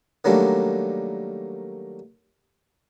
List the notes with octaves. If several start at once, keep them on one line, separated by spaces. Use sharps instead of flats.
D#3 F#3 G3 A3 A#3 D4